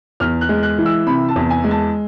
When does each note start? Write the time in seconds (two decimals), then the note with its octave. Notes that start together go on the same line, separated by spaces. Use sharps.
0.20 E2 F6
0.41 F#6
0.49 G#3
0.63 F#6
0.78 E3
0.86 E6
1.07 C3 B5
1.29 A5
1.36 E2
1.50 G#5
1.64 G#3
1.71 A5